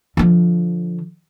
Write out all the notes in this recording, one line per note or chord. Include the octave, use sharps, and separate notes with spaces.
D3 F3